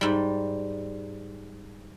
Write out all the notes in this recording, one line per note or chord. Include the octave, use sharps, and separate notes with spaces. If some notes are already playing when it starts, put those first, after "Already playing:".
G#2 G3